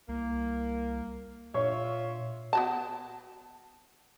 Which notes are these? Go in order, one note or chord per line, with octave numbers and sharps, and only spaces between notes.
C2 A#3
A#2 F4 C#5 E5
B3 F#4 A5